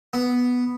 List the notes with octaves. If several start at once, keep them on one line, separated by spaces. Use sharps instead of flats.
B3